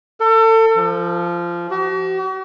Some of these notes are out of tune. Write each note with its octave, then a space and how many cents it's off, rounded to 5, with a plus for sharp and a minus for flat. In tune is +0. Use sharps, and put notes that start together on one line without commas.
A4 +30
F3 -15
F#4 +45